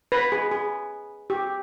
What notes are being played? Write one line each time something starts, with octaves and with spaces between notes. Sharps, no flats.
B4
G#4
G#4
G4